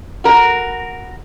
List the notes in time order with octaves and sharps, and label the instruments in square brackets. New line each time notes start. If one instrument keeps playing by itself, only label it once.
[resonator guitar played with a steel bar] F#4 A#4